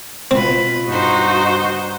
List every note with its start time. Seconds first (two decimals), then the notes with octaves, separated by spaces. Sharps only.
0.31 B2 C4 F4 B4
0.88 G2 D#4 F#4 C5